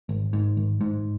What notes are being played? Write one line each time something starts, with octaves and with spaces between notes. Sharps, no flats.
G#1
G#2
G#1
G#2